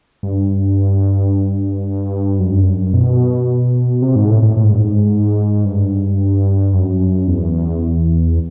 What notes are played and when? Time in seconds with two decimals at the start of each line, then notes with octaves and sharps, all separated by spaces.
0.23 G2
2.40 F#2
2.51 G2
2.63 F#2
2.93 B2
4.02 C3
4.16 G#2
4.29 A2
4.42 A2
4.57 A2
4.64 G#2
4.72 G2
4.78 G#2
5.65 G2
6.73 F#2
7.28 E2